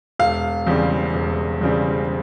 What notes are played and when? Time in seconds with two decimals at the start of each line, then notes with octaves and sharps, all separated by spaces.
0.19 E1 F5
0.67 E2 C#3 G3 C4
1.14 E1
1.61 E2 C#3 G3 C4